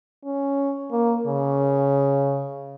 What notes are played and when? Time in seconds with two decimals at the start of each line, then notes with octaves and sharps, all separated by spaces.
0.25 C#4
0.92 A#3
1.26 C#3